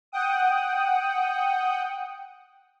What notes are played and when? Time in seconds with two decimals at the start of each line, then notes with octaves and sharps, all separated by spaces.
0.12 F#5 G5 D#6